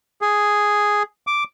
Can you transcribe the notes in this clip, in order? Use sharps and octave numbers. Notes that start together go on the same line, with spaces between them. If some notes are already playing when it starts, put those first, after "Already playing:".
G#4
D6